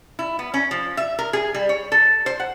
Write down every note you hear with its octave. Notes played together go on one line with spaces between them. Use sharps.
E4
B3
C#4
F3
E5
A#4
G#4
G3
C#5
A4
C5
F#5